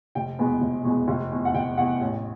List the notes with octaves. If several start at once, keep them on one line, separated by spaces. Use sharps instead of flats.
F1 G5
E2 B2 G#3 B3
F1
E2 B2 G#3 B3
F1
E2 C3
F#5
F1 G5
E2 C3 F#5
A1